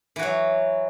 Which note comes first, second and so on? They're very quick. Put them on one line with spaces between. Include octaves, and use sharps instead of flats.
E3 F#4 F#3